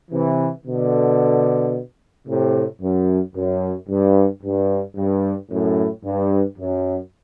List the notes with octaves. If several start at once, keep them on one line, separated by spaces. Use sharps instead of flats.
C3 E3
B2 D3
A2 C3
F#2
F#2
G2
G2
G2
F#2 A2
G2
F#2